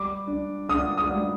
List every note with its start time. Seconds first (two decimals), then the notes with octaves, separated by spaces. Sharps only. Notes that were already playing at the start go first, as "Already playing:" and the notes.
Already playing: G3 D6
0.27 D4
0.69 D4 D#6
0.98 D#6
1.10 G3